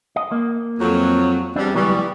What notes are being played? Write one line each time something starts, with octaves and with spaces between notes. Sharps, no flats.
D#5
A#3
F2 F#3
E2 G3 C4 D4
C#2 E3 F#3 G3 B3